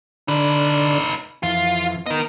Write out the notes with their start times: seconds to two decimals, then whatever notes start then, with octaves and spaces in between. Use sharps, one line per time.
0.28 D3 D4 D#4 B4
1.43 F2 E3 F4
2.06 B3 A#4 D#5